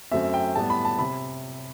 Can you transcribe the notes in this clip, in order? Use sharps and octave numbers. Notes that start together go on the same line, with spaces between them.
F#2 F#3 A3 C4 E5
G5
A2 G3 B3 A5
B5
A5
C3 B5